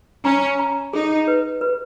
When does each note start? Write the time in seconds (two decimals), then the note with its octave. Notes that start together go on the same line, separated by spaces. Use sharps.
0.25 C#4 A#5
0.59 A#5
0.93 D#4 G#4
1.28 B4
1.61 B4